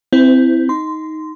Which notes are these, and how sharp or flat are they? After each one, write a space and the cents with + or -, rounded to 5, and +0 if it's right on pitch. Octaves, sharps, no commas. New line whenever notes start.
C4 -10 E4 +0 C5 -45
D#4 +10 C6 -15